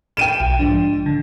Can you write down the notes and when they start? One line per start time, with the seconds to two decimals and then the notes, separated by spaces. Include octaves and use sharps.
0.17 G5 D#7 E7
0.40 B1
0.59 G#2 F3 D4
1.06 D3